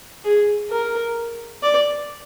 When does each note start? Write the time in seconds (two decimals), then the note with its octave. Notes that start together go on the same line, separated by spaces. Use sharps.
0.24 G#4
0.70 A#4
1.63 D5